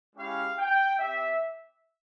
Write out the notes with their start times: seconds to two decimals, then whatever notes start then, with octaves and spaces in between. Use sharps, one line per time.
0.15 G#3 C#4 E4 G4 F5
0.58 G5
0.98 C4 G4 E5